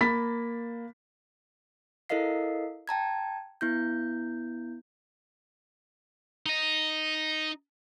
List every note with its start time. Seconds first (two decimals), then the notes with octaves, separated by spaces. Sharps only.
0.01 A#3 B5 A6 B6
2.09 E4 A4 A#4 D#5 F5 C7
2.88 G5 A5 A#5 G#6
3.61 B3 E4 G6
6.46 D#4 D#5